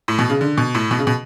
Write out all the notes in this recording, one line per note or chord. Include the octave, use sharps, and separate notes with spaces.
A2
B2
C#3
D3
B2
A2
B2
C#3
B2